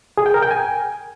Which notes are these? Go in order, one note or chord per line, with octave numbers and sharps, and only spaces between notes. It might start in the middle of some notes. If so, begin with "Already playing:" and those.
G#4
G5
A#4
G5
G#5